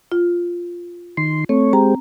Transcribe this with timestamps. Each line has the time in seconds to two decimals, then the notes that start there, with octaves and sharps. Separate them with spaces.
0.12 F4
1.17 D#3 C6
1.49 A3 C4 C#5
1.73 G#3 C4 G4 A#5